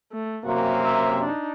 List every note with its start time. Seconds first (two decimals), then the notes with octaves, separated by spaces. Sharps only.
0.12 A3
0.45 F#2 C3 A#3 F#4
0.82 E5
1.23 D4 D#4